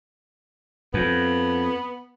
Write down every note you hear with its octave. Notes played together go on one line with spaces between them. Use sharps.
F2 B3